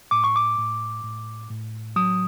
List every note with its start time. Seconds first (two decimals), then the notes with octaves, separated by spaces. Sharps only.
0.11 A2 D6
0.24 C#6
0.36 D6
0.58 A2
1.04 A2
1.50 A2
1.96 F#3 D#6